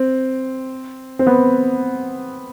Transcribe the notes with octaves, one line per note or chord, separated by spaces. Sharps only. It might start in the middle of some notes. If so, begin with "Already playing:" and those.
Already playing: C4
C4
B3